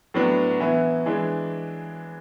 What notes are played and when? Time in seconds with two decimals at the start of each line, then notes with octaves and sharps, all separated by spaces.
0.14 A2 F#3 B3 D4
0.60 E3 B3 E4
1.06 E3 G#3 D4